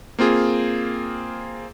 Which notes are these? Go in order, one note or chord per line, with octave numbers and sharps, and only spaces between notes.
A#3 C4 F4 G#4